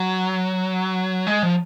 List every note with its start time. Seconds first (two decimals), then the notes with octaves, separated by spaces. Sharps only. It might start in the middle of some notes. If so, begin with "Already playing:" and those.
Already playing: F#3
1.27 G#3
1.43 F3